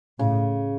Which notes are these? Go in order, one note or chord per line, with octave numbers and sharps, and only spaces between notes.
A2 C#3